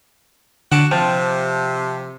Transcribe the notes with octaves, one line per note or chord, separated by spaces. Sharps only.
D3 F#4 F#5 A5 D6
C3 F3 G5 A5